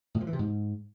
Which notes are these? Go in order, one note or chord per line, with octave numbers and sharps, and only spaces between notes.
A2
F3
E3
C3
G#2